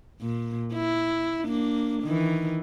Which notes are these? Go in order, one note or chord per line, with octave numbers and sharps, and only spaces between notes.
A#2
E4
A#3 D4
D#3 E3